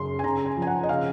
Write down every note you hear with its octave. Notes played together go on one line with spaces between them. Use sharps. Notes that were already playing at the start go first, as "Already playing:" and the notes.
Already playing: F#2 C#3 C6
G#5
C#3 A#5
G#5
F3
G#5
F#5
D#5
C#3 F5